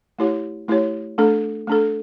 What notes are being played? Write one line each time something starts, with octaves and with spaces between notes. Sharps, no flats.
A3 E4 G4 C#5
A3 E4 G4 C#5
A3 D4 A4
A3 D4 A4